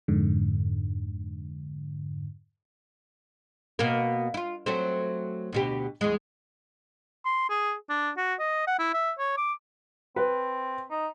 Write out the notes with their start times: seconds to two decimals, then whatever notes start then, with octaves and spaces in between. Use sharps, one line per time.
0.08 F2 G#2 D3
3.79 B2 A#3
4.34 E4 F4
4.66 F#3 A3 C4
5.53 D2 B2 G4
6.01 E2 G#3
7.25 C6
7.50 G#4
7.89 D4
8.17 F#4
8.39 D#5
8.67 F#5
8.79 E4
8.94 E5
9.19 C#5
9.37 D6
10.16 C4 B4
10.91 D#4